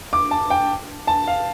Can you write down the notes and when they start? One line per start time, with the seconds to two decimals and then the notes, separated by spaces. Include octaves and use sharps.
0.13 D6
0.31 A5
0.50 G5
1.07 A5
1.27 F5